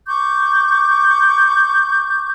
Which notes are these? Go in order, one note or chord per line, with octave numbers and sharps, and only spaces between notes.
C#6 D6 G6